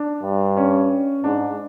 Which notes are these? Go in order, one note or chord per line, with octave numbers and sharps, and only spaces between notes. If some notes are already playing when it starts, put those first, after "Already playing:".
Already playing: D4
G2
C#4
G#2 D4